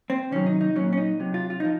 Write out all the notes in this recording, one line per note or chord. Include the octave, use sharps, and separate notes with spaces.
C4
C3 D#3 F#3 C#4
D#4
D#4
A#2 F#3 C#4
C#4
D#4
C3 F#3
F4
F4
F3 D#4